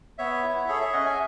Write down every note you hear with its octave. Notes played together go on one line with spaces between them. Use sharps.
B3 C#5 E5
E4
G#4 A4 C#5
C#5 E5
C#4 D#5 F#5
E5 G#5